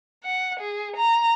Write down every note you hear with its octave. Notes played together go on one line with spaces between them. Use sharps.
F#5
G#4
A#5